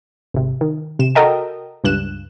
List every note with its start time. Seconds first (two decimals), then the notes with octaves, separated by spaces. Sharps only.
0.34 G#1 C3
0.61 D#3
0.99 C3 E7
1.15 F#4 A4 A#4 D#5 G5
1.84 C#2 G2 F#6 E7